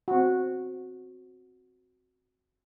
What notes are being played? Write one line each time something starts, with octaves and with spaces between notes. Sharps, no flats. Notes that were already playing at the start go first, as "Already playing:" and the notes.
C4 F#4